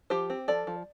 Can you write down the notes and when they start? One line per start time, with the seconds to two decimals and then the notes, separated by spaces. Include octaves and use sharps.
0.10 F3 G4 C5
0.30 C4
0.48 F3 A4 D5
0.67 F3